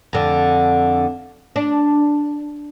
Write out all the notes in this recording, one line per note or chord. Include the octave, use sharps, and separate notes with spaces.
F2 D3
D4